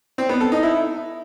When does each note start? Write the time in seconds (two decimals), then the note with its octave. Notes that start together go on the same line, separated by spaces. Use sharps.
0.18 C4
0.29 B3
0.41 A4
0.52 D#4
0.63 E4